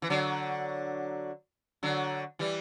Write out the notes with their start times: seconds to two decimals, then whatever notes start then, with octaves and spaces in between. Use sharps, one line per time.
0.02 E3
0.10 D3 F#3
1.83 D3 F#3
2.39 E3 G3